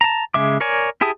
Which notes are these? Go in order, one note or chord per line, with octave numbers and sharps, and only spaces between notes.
A5 A#5
C#3 G#3 E5 D6
A#4 C#5 D5 G#5
E4 G4 G#4 A5 D#6